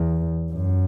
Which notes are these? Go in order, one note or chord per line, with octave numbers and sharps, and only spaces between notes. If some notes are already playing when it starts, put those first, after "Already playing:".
Already playing: E2
F#2